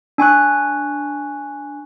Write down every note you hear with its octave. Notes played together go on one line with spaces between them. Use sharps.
D4 G#5 C#6 F#6